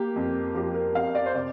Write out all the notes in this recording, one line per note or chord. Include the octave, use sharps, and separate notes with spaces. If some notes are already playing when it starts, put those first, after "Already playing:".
Already playing: A#3 G4
F2
F3 G4
A#4
F2 F5
D5
C5
C3 D5